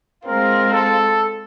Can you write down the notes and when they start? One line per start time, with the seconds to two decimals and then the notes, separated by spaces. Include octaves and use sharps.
0.25 G#3 C4 F4 A#4
0.72 A4